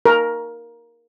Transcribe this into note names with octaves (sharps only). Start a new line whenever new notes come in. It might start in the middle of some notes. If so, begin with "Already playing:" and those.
A#4